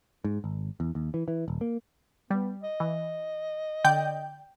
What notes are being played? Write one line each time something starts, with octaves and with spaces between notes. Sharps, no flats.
G#2
G#1
E2
D#2
E3
E3
D#1
A#3
G3 B3
D#5
E3
D3 D5 G5 G6